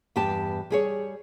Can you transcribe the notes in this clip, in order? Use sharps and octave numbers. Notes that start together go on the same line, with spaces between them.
E2 G2 G4 A5
G3 G#4 C#5